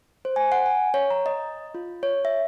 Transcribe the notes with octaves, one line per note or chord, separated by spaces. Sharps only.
C5
G#5
F#5
G#5
C#5
A#5
D#5
F4
C#5
E5